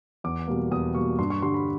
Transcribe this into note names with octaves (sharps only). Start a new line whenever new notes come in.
E2 D6
B2 G3 A#3
E2 D#6
B2 G3 A#3 C#6
G2 C6
C#6
D3 G3 C6
B5